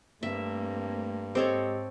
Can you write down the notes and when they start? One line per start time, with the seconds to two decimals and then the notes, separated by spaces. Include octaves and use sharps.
0.23 G2 A3 A#3 C4 E5
1.35 G#2 C4 G4 A4 C#5 D#5